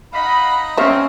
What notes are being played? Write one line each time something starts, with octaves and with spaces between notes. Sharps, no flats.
D#4 D#5 F5 F#5 B5
G3 G#3 C4 C#4 E5 F5 C#6